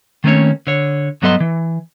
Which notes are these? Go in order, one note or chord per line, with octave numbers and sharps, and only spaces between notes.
D#3 A3 A#3 C4 C#4 C#5
D3 C#5
G2 F#3 B3 A4 D#5 C6
E3